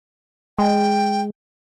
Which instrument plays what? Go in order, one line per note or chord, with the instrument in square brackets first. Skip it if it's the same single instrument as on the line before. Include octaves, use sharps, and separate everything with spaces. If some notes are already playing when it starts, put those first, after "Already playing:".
[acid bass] G#3 [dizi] G5